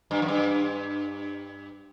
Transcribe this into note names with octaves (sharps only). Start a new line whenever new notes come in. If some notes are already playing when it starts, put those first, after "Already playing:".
G2
F#2
G2